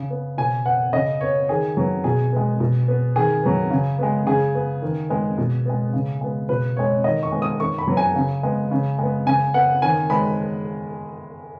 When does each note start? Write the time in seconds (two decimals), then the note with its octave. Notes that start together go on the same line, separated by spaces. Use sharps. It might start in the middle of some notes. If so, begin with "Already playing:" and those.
Already playing: C#3
0.10 B3
0.37 B2 G#5
0.65 B3 F#5
0.93 C#3 D#5
1.21 B3 C#5
1.49 D#3 G#4
1.77 F#3 B3
2.04 B2 G#4
2.33 G#3 B3
2.60 B2
2.88 B3
3.16 D#3 G#4
3.43 F#3 B3
3.70 C#3
3.99 G#3 B3
4.27 C#3 G#4
4.55 B3
4.82 D#3
5.10 G#3 B3
5.38 B2
5.66 G#3 B3
5.93 C#3
6.21 G#3 B3
6.49 B2 B4
6.76 G#3 B3 C#5
7.04 D#3 D#5
7.23 C#6
7.32 G#3 B3
7.42 D#6
7.60 D#3 C#6
7.78 B5
7.87 F#3 B3
7.97 G#5
8.16 C#3
8.43 G#3 B3
8.71 C#3
8.98 G#3 B3
9.26 C#3 G#5
9.54 B3 F#5
9.82 D#3 G#5
10.10 G#3 B3 B5